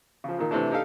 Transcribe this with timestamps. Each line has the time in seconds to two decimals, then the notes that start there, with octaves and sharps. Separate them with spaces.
0.24 C#3 F3
0.38 A#2 D#3 A#3
0.51 C3 E3 A3 D4
0.70 D4 D#4 G4 A4 F5